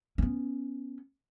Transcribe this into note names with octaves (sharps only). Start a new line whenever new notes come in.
B3 C#4